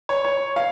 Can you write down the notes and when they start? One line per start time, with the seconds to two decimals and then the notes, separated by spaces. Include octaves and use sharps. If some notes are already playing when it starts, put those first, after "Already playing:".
0.09 C#5
0.25 C#5
0.56 F5